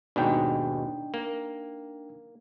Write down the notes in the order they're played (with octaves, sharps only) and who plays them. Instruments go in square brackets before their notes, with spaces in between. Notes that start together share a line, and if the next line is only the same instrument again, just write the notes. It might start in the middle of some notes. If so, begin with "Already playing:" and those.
[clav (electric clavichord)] D#2 G#2 B2 [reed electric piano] D4 D#4 G5
[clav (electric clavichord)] A#3